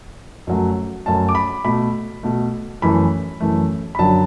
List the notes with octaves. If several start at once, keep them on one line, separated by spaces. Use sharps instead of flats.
F#2 F#3 A3
F#2 F#3 A3 A5
D6
B5
B2 A3 B5
B2 A3
F#2 E3 A3 B5
F#2 E3 A3
B5
F#2 D3 F#3 A5